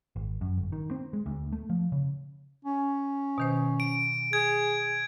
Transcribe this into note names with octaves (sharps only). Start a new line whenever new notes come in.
G#1
F#2
G1
D#3
C4
G#3
D2
A3
F3
C#3
C#4
B2 D#3 C5
D7
G#4 G#6